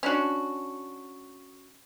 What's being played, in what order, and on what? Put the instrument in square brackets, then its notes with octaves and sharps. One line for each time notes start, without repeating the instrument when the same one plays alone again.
[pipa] C#4 D4 F#4